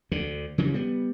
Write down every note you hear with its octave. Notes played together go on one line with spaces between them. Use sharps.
D2 D3
C#3 E3 F3 G3
G3 B3